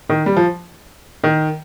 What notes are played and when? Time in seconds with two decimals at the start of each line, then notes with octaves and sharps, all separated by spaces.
0.10 D#3
0.26 G3
0.37 F3
1.24 D#3